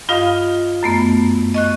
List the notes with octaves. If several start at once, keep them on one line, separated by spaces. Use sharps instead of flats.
G2 F4 D#5 F5 D#6
F#2 A3 B3
D#5 C#6 F#6